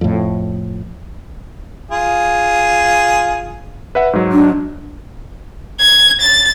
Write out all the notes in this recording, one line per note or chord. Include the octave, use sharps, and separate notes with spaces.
F2 A2
F4 G#4
B4 E5 F#5
G#2 F#3
D4
G#6
A6